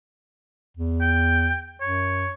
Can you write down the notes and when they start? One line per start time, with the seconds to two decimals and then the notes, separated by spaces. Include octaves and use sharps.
0.77 E2
1.01 G5
1.81 F#2 C#5